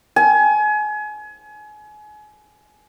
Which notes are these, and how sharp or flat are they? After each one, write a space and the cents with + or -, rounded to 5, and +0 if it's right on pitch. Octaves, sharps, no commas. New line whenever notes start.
G#5 +30